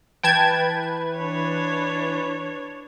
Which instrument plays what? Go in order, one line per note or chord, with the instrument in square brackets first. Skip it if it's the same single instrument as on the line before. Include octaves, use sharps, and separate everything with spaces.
[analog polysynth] E3 B4 [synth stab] G5 A5 G#6
[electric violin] D4 C#5